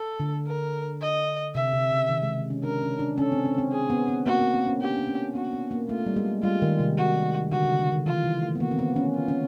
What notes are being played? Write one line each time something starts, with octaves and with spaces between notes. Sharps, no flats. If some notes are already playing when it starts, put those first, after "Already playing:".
Already playing: A4
D3
A#4
D#5
C3 E5
C3
C#3
D#3
G#3
C#4
D4 A#4
C#4
D4
C#4 A4
C4
C4
C4
G#4
B3
C4
A#3 F#4
B3
C4
C#4
D4 G4
D4
C#4
B3 F#4
B3
A#3
A3 F4
G3
G#3
G3 F4
D#3
C3
F#4
D3 F#4
C#3
D3
D#3
E3 F4
E3
A3
B3
A#3 F#4
C4
B3
C#4
F4
C#4